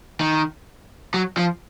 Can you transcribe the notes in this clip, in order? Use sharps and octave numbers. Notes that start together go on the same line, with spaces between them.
D#3
F#3
F3